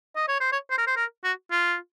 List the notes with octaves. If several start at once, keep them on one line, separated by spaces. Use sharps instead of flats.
D#5
C#5
C5
C#5
C5
A#4
C5
A#4
F#4
F4